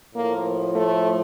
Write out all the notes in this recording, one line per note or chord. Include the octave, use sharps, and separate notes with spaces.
A2 F3 A#3
A3